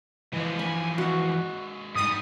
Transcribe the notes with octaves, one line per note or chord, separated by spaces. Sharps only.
E3 F3 G#3
G#5 B5
G#3 A#3 F#4
G#2 G3 D#6